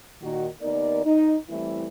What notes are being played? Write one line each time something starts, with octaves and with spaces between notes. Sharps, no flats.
A#2 D#3 F#4
D#2 B3 D#4 A#4 D5
D#4
E3 G3 A3 C4 E4